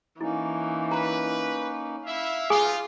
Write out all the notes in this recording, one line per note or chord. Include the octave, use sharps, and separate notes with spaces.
E3 A#3 C#4 D#4 E4
B4 A#5
E4 E5 F5
B3 D#4 F4 G#4 G#5 D#6